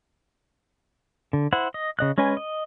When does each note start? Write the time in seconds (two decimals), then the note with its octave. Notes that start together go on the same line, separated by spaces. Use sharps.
1.33 D3
1.53 E4 C5 F#5
1.74 D#5
1.99 C#3 D#5 F#6
2.18 G#3 C#4 G#4 B4 G#5
2.37 D#5